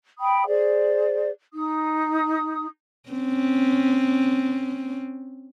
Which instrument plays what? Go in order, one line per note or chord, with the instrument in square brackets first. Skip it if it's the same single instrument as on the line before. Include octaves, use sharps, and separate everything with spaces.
[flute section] G5 B5 D#6
G#4 C5 D5
D#4 D#6
[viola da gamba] C4 C#4